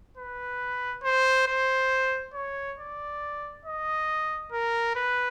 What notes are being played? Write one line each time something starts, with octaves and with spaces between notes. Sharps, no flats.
B4
C5
C5
C#5
D5
D#5
A#4
B4